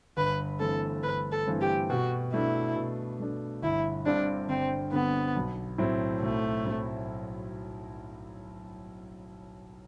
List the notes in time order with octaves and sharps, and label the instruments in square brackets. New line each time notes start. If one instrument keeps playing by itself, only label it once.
[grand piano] G1 [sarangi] B4
[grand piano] G2 E3 A3 C4 [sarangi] A4
[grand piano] G1 [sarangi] B4
[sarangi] A4
[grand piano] G2 E3 A3 C4
[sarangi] G4
[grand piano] B2 [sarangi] F#4
[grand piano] A3 D4 [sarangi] E4
[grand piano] B2
A3 D4
[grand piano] G1 [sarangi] E4
[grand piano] G2 D3 G3 C4 [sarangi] D4
[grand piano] G1 [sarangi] C4
[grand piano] G2 D3 G3 C4 [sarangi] B3
[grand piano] B1
A2 F#3 C4 E4
[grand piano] B1 [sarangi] A3
[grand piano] A2 F#3 C4 E4